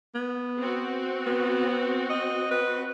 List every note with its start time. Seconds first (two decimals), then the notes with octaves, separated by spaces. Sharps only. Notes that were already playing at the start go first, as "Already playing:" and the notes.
0.15 B3
0.59 C4 F#4
1.26 B3
2.10 D#5
2.51 B4